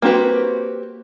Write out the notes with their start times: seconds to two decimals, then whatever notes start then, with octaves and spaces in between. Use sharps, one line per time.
0.02 A#3 C4 F#4 G4 B4